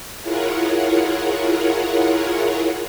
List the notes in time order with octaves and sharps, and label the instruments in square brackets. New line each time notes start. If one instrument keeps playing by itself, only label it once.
[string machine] E4 F4 G#4 A#4 C#5 F#5